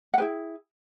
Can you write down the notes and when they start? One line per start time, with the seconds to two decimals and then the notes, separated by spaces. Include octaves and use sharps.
0.14 F#5
0.18 E4 G#4 B4 G5